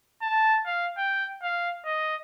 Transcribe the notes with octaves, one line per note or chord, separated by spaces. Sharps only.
A5
F5
G5
F5
D#5